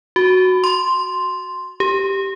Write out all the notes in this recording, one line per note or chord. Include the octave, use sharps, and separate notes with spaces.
F#4
C6
G4